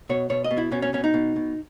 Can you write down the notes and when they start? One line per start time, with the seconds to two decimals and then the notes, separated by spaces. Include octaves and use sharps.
0.09 B2 C#5
0.30 B2 C#5
0.44 D#5
0.51 B2
0.58 E4
0.72 B2 C#4
0.82 C#4
0.93 B2 C#4
1.04 D#4
1.14 B2
1.36 B2